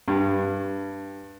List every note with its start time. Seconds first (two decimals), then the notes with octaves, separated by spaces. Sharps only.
0.08 G2